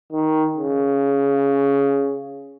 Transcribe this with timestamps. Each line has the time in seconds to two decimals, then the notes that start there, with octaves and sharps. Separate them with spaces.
0.12 D#3
0.57 C#3